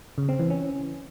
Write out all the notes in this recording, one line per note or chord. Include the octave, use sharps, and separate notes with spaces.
C#3
C4
E3
C#4